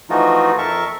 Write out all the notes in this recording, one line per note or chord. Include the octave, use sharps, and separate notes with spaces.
E3 F3 A3 D#4 F4 F#4
F2 A#4 E5 A5 C#6